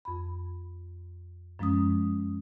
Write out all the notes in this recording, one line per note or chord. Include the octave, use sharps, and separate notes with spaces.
F2 B5
F#2 F3 G#3 C#4 D#6